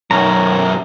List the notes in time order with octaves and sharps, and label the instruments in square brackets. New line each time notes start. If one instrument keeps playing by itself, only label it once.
[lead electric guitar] B1 F#2 [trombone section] D#3 C#4 [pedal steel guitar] A#5